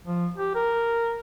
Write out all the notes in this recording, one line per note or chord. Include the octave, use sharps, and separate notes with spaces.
F3
G4
A#4